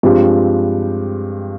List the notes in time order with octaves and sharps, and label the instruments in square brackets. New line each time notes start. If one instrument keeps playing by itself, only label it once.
[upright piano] G2 F3 G#3 C4 G4